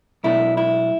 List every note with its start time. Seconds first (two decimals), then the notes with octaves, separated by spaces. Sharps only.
0.24 B1 B2 A3 D4 E4
0.57 E4